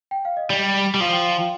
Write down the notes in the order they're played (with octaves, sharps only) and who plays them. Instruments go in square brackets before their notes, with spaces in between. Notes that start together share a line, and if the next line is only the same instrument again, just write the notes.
[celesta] G5
F5
D#5
[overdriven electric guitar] G3 [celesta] D5
[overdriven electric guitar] G3
[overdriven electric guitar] F3 [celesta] F5
[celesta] G5
F5
G5